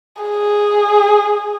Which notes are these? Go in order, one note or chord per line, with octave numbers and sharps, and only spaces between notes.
G#4